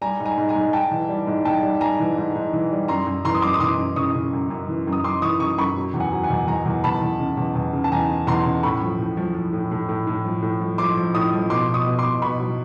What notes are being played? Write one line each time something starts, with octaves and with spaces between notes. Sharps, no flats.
G3 G#5 A#5
G#2
G#5 A#5
G#2
G#5 A#5
G#2
G#2 G5 A5
E3
G3
G#2
G#2 G5 A5
G3
G#2 G#5 A#5
E3
G#2
G#2
E3
G3
F#2 A#5 C6
F#2
E3 A#5 C6
D#6
F#2 C6 D6
D#6
E3 C6 D6
F#2
C#3 C#6 D#6
C#3
F#2
F#2
E3
F#2
D#6
F#2 C6 D6
E3 C#6 D#6
F#2 C#6 D#6
F#2 B5 C#6
F#3
E2
F#5 G#5
F#3
F#5 G#5
E2
E2 G#5 A#5
E2
E2 A5 B5
E2
C#3
E2
E2
C#3
A5
E2 G#5 A#5
C#3
E2 A#5 C6
C#3
A2 B5 C#6
F3
A2
F3
F3
A2
A2
A2
A2
F3
A2
F3
F3 C6 D6
F3
A2 C#6 D#6
F3
B2 C6 D6
B2
C#6 D#6
B2
C6 D6
B2
B2 B5 C#6
F#3